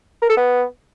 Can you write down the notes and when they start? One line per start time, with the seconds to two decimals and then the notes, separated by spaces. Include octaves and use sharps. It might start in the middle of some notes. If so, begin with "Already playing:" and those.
0.22 A#4
0.30 A4
0.37 B3